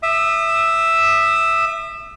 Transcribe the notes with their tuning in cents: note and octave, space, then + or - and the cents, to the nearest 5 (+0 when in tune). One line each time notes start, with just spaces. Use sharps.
E5 +0 D#6 -40